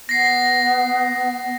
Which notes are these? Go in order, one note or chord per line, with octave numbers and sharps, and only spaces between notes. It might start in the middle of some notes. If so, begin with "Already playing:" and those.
B3 A#6 C7